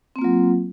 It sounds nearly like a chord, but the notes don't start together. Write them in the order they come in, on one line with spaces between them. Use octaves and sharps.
C4 A#3 F4 F#3